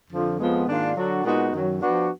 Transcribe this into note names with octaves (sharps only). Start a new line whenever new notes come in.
F2 D3 F3
F2 F3 G#3 B3
G#2 D#3 A#3 D4 F4
D3 F#3 D4 F#4
A#2 G#3 B3 D#4 F#4
F#2 D#3 F#3
F3 B3 D4 F#4